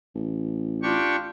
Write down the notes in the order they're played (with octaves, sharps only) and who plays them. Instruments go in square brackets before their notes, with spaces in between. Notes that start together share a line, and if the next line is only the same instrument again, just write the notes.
[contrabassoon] A1
[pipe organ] D4 G4 C#6 [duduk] F4